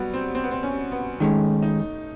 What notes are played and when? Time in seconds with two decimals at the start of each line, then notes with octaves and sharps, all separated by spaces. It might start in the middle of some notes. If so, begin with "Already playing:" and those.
Already playing: F#3 G3 B3
0.14 C4
0.35 C4
0.44 B3
0.51 C4
0.63 C#4
0.92 B3
1.20 D#3 G#3 A3 C#4
1.63 D#4